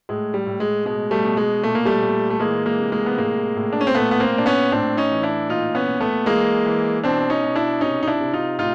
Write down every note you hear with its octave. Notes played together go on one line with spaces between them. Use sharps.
A2 G#3
G3
A2
G#3
B2 G#3
G3 A3
B2
G#3
A#2 A3
A#3
G3 A3
A#2
A3
E3 G#3 A#3
G#3 A#3
C3
G#3 A#3
B3
A2 G#3 A#3
A2
D4
C#4
C4
A#2 A3 B3
B3
A#3 C4
A#2 D4
B3 C#4
A2 C4 D4
C#4 D#4
E3
D4 E4
A#2 D#4 F4
B3 C#4
A#2
A3 B3
E3 G#3 A#3
E3
B2 C4 D4
C#4 D#4
B2
D4 E4
C3 C#4 D#4
D#4
D4 E4
C3
D#4 F4
A2 D#4 F4